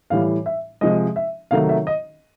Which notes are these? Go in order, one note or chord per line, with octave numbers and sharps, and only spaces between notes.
A2 E3 G3 F5
E5
C3 F3 G#3 D#5
E5
C3 D#3 F#3 A3 F5
E5
D#5